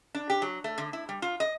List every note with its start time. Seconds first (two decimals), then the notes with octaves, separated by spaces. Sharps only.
0.14 D4
0.30 G4
0.42 F#3
0.64 A3
0.78 D3
0.93 E4
1.09 G3
1.22 F4
1.40 D#5